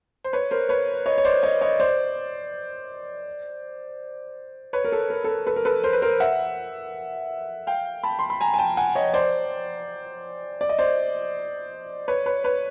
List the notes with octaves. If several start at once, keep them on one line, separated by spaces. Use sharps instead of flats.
C5
B4 C#5
A#4 C5
B4 C#5
C#5 D#5
C#5
C5 D5
C#5 D#5
C#5 D#5
C5 D5
B4 C#5
A#4
A4
A#4
A4
A#4
A4 B4
A#4
A4 B4
A#4 C5
B4
A#4 C5
E5 F#5
F5 G5
A5 B5
C6
B5
G#5 A#5
G#5
G5 A5
F#5 G#5
C#5 D#5
C5 D5
D5
D#5
C5 D5
B4 C#5
B4 C#5
B4 C#5